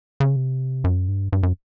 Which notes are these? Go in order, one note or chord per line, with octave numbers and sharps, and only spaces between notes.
C#3
C3
F#2
G2
G2
F#2